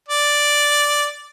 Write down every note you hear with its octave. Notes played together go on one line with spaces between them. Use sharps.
D5